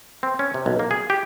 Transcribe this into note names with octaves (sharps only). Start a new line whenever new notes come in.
C4
C#4
C3
B1
A#3
G#4
G4